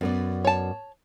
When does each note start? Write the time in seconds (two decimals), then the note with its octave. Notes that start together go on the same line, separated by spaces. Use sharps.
0.01 F#2 B3 D5
0.45 C#5 A5